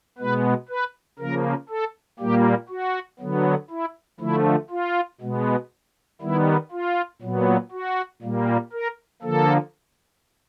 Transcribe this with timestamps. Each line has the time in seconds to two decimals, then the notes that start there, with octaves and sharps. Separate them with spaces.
0.18 B2 G#3 B3 B4
0.69 B4
1.19 C#3 F3 A#3 A#4
1.69 A4
2.19 A#2 G3 A#3 G4
2.69 F#4
3.19 D3 F#3 B3
3.70 E4
4.20 D3 F3 A3 E4
4.70 F4
5.21 B2 G#3 B3
6.21 D#3 G3 B3 E4
6.72 F4
7.22 A#2 F#3 B3
7.72 F#4
8.22 A#2 G3 A#3
8.73 A#4
9.22 D3 F3 A#3 A4